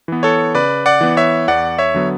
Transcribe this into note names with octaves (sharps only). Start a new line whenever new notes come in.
E3 B3
A4 C#5
C#3 B4 D5
D5 F#5
E3 B3
C#5 E5
E2 D5 F#5
C#5 E5
D3 F#3 B3